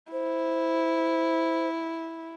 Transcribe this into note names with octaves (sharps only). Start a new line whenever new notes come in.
E4 C5